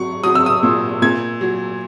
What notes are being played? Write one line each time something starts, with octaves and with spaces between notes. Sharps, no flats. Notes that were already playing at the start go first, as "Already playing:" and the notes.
Already playing: F#3 C#6
F#3 D#6
E6
D#6
A#2
A#2 G#6
F#3